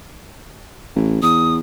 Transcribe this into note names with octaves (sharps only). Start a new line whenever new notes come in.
A1
E2 D#6